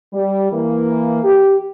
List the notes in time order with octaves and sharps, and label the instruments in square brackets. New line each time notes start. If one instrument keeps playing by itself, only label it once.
[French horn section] G3
E3 A#3
G4